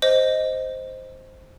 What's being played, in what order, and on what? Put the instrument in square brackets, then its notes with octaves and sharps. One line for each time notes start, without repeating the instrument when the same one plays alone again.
[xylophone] C5 D#5